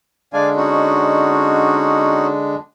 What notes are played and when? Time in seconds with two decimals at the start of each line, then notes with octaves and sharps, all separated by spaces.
0.33 D3 G#3 D4 D5 F5 G#5
0.56 C#4 D#4 F#4